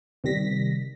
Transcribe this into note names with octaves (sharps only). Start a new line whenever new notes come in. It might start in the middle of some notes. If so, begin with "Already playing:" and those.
C3 D#3 G3 A#6 B6